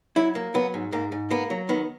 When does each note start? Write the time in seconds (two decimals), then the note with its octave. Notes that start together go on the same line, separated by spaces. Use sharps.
0.16 F#3 E4
0.35 A#3
0.54 F#3 B3
0.74 G#2
0.92 G#2 A#3
1.12 G#2
1.31 A#3 B3
1.50 F#3
1.69 D#3 B3